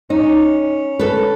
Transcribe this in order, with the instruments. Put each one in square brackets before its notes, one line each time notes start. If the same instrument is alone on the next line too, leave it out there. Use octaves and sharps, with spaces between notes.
[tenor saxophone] C#4 [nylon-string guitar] D#4
[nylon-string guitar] A4 B4